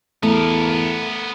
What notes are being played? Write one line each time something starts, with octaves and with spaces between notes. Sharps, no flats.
E2 A3 B3 A#4